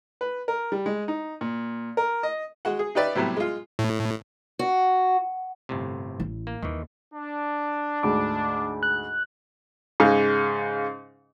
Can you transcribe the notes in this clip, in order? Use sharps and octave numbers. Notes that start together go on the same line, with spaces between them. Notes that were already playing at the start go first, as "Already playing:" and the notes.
B4
A#4
G3
G#3
D#4
A#2
A#4
D#5
G#3 F#4 F#5
G#4
D#4 G4 B4 D5 E5
A2 C3 F#3 G3 B3
G#3 F4
A2
F#4
G1 A2 C3
A1 E4
A#3
D#2 D#3 E3
D4
D2 G#2 D6
F#6
G#2 C#3 G#3 F5